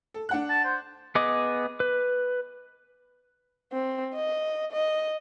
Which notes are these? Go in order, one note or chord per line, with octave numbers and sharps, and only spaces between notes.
A4
D4 F#5 F#6
A5
C5
B3 G#4 D#5 D6
B4
C4
D#5
D#5